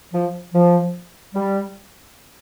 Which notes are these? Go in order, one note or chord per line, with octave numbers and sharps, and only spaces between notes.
F3
F3
G3